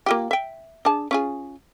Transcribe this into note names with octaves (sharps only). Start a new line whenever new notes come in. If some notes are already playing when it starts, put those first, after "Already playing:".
A#3 F4 G4
E5 G5
D4 G#4 A5
C#4 F4 G#4